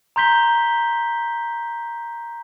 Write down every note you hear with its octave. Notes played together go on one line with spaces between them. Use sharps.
A#5 C6 G6 B6 G7